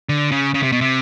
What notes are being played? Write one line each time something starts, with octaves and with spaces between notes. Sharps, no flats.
D3
C#3
C#3
C3
B2
C3